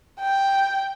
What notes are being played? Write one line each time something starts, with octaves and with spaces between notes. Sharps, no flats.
G5